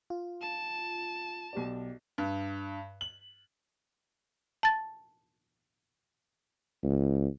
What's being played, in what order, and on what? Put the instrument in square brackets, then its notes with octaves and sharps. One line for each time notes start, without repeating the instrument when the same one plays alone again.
[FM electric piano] F4
[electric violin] A5
[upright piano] B1 G4 D5
[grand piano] G2
F#7
[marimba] A5 A6
[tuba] C#2